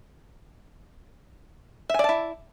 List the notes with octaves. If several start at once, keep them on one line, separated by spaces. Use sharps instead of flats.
E4 D5 E5 G#5 A5